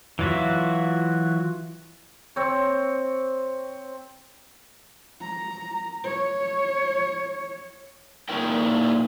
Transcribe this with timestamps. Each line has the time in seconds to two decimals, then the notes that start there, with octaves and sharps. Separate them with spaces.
0.19 E3 F#3 F4 F#4 E5
2.36 C4 C#5
5.21 A#5
6.04 C#5
8.29 A#2 G3 D#4 E4 A#4 G5